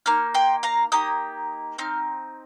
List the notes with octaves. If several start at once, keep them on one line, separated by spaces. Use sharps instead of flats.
A#3 D#4 F6
G5 C6
F5 A#5
A#3 D#4 G4 D#6
C4 D#4 F6